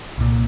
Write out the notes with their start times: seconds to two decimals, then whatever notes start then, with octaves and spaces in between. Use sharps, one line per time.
0.18 C2 A#2